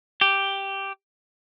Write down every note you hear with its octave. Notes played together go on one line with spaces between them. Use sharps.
G4